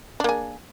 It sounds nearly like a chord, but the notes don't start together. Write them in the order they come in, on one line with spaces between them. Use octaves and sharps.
D4 A#3 G#4